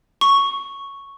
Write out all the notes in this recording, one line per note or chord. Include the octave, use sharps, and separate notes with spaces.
C#6